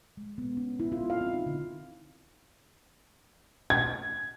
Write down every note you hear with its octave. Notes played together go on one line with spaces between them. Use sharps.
G#3
B3
C#4
E4
F4
F5
C4
D#4
D3
G#6